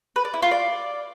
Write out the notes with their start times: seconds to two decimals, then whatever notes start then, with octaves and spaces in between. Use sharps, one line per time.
0.16 B4
0.25 D5
0.34 E4
0.42 F4
0.51 D5